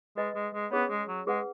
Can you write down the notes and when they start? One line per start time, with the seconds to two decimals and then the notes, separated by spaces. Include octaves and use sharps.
0.17 G#3 B4 D#5 G#5 B5
0.36 G#3
0.54 G#3
0.72 B3 C#4 G#4 C#5
0.90 G#3
1.08 F#3
1.27 G#3 G#4 B4 F#5